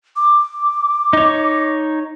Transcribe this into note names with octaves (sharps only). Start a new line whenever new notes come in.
D6
D#4 C#5